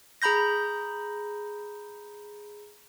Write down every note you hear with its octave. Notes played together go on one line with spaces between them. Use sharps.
G#4 A#5 B5 G6 A#6